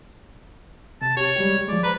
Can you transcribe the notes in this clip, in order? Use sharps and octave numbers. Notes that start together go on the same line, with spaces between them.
C3 A5
G4 C#5
G3 G#3 G4
F3 G#3 D5
B4 C5 A#5 B5